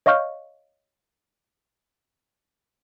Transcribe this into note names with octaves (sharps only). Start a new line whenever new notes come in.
C#5 D#5 F5 C#6 F6 G6